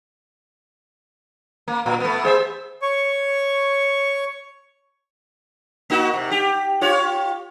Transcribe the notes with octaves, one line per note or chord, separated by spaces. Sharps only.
A#3
A#2
A3 B3
G#4 C5 E5
C#5 C#6
A#3 D#4 F#4
C3
G4
F4 G4 C#5